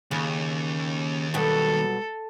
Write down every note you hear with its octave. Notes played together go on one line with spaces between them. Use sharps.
D#2 C#3
B2 F#3 G3 A4